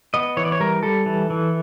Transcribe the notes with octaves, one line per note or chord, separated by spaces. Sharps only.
B3 D#5
E3 C#5
D5
C#5
G3 A#4
G3 A4
E3
E3